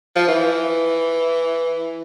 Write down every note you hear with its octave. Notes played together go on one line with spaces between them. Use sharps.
F3
E3